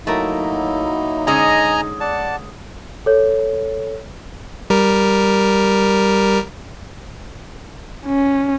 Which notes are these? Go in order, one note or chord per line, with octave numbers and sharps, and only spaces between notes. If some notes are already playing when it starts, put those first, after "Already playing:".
F#3 A3 A#3 D#4 E4 A#4
D3 G#3 C#4 D#5 G#5 A#5
D5 F#5 A5
A4 C#5
G3 A#4
C#4